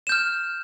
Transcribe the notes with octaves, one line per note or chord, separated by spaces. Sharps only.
F6 G6 E7